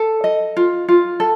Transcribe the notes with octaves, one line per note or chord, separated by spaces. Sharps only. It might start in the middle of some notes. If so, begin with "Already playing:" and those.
Already playing: A4
D#5
F4
F4
A4